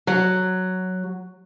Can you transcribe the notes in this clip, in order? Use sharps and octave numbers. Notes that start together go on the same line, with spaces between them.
F#3